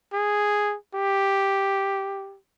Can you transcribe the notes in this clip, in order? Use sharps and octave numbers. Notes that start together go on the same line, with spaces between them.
G#4
G4